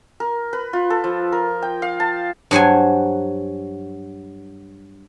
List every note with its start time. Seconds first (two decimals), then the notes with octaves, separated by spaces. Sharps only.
0.20 A#4
0.53 B4
0.73 F4
0.90 A4
1.04 F3
1.32 A#4
1.62 G5
1.82 F5
2.00 A5
2.51 G2 F#3 C5 G#5